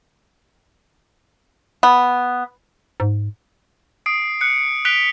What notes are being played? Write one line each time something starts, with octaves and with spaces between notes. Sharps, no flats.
B3
G#2
D#6 C7 D7
F#6 C#7
F#6 B6 D7 F7 G7